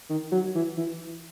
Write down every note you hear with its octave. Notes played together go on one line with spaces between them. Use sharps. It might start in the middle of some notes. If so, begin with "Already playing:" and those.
D#3
F#3
E3
E3